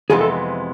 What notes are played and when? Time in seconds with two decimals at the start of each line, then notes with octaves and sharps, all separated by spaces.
0.10 F2 C3 E3 G#3 B3 G#4
0.21 A4